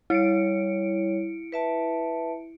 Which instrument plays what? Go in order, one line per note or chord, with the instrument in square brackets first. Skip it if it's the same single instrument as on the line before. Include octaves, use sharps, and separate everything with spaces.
[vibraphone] G3 C#5 [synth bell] E4 C#7 D7
[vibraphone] B4 E5 A5